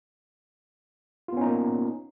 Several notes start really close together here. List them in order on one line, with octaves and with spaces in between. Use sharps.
F4 B3 C#4 D#4 A#3